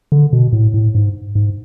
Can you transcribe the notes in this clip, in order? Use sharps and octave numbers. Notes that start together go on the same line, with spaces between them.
D3
B2
A2
A2
G#2
G#2